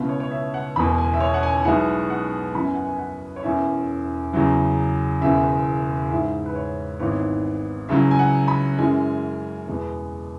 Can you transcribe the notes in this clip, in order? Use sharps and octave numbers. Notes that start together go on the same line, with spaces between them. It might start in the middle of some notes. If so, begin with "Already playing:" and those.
Already playing: C#2 B2 B3 E4
C#5
C#5
E5
F#5
E1 E2 B2 B5
G#5
E5
C#5
F#5
G#5
B1 B2 G#3 B3 E4 F#5
F#5
F#2 E3 B3 E4 B5
G#5
F#5
G#5
F#5
C#5
E1 E2 E3 C#4 E5
E2 C#3 F#3 E4
E1 E2 C#3 E5
G#2 E3 G#3 E4 E5
B4
C#5
G#1 G#2 E3 B3 C#5
C#2 C#3 F#3 E4 E5
G#5
F#5
B5
F#2 E3 G#3 G#5
E2 B2 G#3 B3